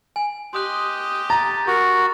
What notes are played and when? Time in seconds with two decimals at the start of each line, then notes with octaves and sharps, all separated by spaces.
0.16 G#5
0.53 G4 D#5 C6 D#6 F#6
1.30 A#5 A6
1.67 F#4 A#4